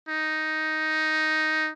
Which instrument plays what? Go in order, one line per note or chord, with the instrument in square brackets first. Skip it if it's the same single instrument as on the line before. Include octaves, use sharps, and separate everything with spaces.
[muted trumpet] D#4